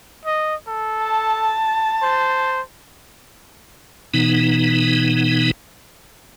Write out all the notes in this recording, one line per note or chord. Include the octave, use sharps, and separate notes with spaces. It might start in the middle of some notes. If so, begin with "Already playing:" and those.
D#5
A4
A5
C5
B2 E3 B3 D#4